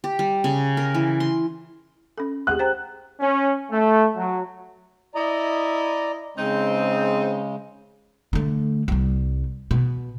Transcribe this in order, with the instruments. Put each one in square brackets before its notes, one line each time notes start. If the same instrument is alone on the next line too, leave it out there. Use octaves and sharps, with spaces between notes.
[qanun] G4
G3
C#3
A#4
E3
C6
[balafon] C#4 A4
[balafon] G4 G#4 F#5 [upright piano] F#6
[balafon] C5 G5 A#5
[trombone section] C#4
A3
F#3
[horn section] E4 D#5 [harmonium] D5 A#5
[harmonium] C#3 G#3 [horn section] C4 D#4 C5
[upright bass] D3 A3
C2 G3
B2